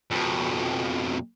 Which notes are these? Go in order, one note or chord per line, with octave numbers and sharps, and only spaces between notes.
F2 B2